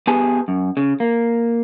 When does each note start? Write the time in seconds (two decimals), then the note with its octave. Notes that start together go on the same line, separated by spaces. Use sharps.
0.07 B3 G4 G#4 B4 G#5 A5
0.48 F#2
0.77 C#3
1.00 A#3